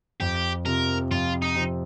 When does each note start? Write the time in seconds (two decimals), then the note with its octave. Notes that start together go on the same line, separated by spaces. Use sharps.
0.20 F2 G4
0.66 C3 F3 C4 A#4
1.11 F2 F4
1.42 D#4
1.56 C3 F3 C4